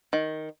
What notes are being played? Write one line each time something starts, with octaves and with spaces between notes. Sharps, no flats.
D#3